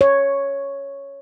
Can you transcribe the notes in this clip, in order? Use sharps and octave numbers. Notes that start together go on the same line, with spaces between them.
C#5